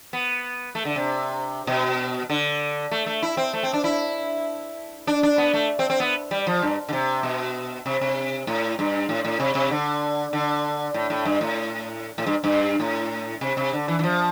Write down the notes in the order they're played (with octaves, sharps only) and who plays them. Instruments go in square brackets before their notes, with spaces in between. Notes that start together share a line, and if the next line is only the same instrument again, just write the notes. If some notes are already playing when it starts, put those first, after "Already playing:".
[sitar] B3
A3
D3
C3
B2
D3
A3
A3
E4
C4
A3
C4
D4
E4
D4
D4
B3
A3
C4
C4
B3
G3
F3
G2
D3
C3
B2
C3
C3
A2
G2
A2
A2
C3
C3
D3
D3
A2
A2
G2
A2
A2
G2
G2
A2
C3
C3
D3
E3
E3
F3